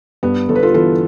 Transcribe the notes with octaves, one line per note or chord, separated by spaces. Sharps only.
G2 B3
G1 A4
B4
F4 A4
E3 F4 A4